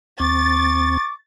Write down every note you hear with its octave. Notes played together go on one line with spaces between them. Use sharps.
D#2 C4 C#6 D6 A6